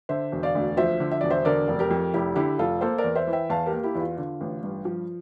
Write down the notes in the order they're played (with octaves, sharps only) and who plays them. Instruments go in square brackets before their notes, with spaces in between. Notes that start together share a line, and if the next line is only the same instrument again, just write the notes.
[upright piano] D3 C5 E5
E1
D5 F5
D2
F3 C5 E5
D3
E5
E1 D5
C5 E5
D3 A#4 D5
F1
G4 A#4
F2
F1 E4 G4
D3 E4 G4
F1 F4 A4
A#3 A4 C5
A#4 D5
E2
C5 E5
E3
E5 G5
E2 F5 A5
G4 A#4
A#3
E4 G4
E2 E4
F4
D3 F4
A1
G2
F3